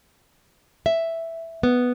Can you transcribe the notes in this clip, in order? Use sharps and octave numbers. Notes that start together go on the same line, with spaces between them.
E5
B3